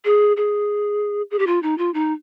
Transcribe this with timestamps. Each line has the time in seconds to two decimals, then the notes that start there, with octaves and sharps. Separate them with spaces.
0.05 G#4
0.37 G#4
1.31 G#4
1.39 G4
1.47 F4
1.63 D#4
1.78 F4
1.94 D#4